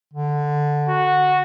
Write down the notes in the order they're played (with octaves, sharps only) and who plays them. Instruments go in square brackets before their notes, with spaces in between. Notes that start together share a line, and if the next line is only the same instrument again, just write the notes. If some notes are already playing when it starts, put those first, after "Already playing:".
[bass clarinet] D3
[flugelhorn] F#4